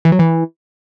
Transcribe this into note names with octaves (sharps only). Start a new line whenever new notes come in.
E3
F#3
E3